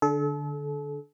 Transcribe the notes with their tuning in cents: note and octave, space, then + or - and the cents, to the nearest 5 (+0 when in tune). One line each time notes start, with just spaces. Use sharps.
D3 +0 A4 -35